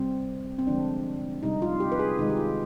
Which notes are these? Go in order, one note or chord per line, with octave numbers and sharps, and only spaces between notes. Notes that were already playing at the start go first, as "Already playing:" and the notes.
Already playing: C3 G3 C4
C4
D3 F3 G#3 D4
C3 G3 D#4
F4
G4
B4
G#4
C3 D#3 G#3 D#4
G4
F4